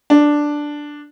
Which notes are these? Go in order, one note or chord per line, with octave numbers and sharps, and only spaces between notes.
D4